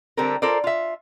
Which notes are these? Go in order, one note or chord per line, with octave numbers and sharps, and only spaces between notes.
D3 G3 C4 G4 A4 A#4
F4 A4 A#4 C5 D5
F4 E5